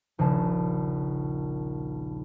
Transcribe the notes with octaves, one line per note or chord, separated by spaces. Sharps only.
D#1 A#1 C#3 A5 C7